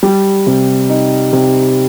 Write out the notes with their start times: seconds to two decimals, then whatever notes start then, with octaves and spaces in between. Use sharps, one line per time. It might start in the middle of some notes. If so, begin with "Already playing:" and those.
0.03 G3
0.46 C3
0.89 D#4
1.33 C3